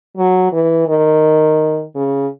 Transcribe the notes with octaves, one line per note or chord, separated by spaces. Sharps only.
F#3
E3
D#3
C#3